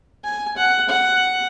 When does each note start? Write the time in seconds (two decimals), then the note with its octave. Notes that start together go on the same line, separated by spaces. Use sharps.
0.24 G#5
0.57 F#5
0.89 F#5